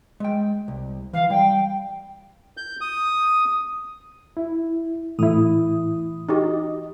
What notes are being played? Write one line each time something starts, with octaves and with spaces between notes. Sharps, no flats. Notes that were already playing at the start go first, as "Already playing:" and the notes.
G#3 G5
C2
E3 F5
G3 G5
G6
D#6
E4
A2 E3 E4 D#6
D#4 F#4 G4 D#5